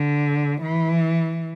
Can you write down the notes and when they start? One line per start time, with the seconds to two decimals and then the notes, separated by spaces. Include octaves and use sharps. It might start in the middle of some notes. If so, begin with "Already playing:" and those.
Already playing: D3
0.61 E3